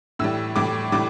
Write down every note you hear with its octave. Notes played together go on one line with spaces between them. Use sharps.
A2 E3 G3 E6
A2 E3 G3 D6
A2 E3 G3 D6